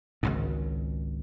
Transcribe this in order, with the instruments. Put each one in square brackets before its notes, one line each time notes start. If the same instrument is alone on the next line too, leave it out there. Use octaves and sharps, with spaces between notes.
[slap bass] G#1 C#2 G#2